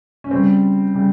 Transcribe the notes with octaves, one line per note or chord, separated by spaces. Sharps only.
C#4
C#3 G3 C4
C#3 G3